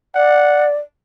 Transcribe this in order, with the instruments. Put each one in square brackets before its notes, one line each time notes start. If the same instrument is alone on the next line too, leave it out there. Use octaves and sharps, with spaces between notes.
[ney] D5 [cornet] F#5